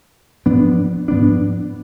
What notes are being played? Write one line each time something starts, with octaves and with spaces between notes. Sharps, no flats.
G#2 F3 B3 D4
G#2 F3 B3 D4